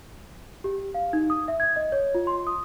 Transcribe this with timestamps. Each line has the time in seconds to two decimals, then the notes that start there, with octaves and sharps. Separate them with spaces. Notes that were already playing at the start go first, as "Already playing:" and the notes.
0.64 G4
0.94 F5
1.13 D#4
1.30 D#6
1.48 E5
1.60 G#6
1.76 D#5
1.92 C#5
2.15 F4
2.27 C6
2.47 D#6